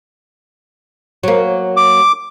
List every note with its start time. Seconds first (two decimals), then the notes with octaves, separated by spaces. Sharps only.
1.23 F#3 A#3
1.77 D6